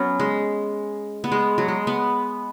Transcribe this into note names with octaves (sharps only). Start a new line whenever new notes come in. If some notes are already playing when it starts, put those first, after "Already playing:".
Already playing: F#3 B3 C#4
G#3
B3
G#3
F#3
G#3
B3